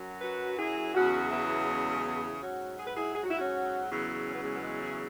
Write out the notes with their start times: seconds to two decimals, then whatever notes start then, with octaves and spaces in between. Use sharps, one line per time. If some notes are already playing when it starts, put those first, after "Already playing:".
Already playing: F#2 F#3
0.21 F#4 B4
0.58 E4 G#4
0.94 E2 C#3 F#3 C#4 F#4
1.31 B3 E4
1.68 G#3 C#4
2.05 B3 E4
2.41 G#2 F#3 C#4 F#4
2.79 G#4
2.87 B4
2.96 E4 G#4
3.15 G#4
3.23 F#4
3.30 E4
3.38 C#4 F#4
3.89 E2 C#3 F#3
4.26 C#4
4.35 B3
4.42 G#3 C#4
4.53 B3
4.63 G#3
4.81 E4 G#4